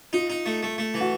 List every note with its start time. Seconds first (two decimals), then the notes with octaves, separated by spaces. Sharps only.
0.13 D#4 F4
0.30 D#4
0.46 A3
0.63 A3
0.78 A3
0.94 E3
1.01 F#4